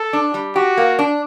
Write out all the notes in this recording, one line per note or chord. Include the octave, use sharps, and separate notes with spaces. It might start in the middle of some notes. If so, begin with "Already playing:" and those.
Already playing: A4
D4
G3
F#4 G4
A#3
D4